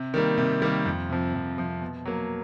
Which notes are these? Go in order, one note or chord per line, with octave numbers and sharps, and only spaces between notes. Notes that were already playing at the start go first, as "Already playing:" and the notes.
Already playing: C3
D#3 G3 A#3
C3
D#3 G3 A#3
F2
C3 F3
F2
C3 F3
B2
F#3 A#3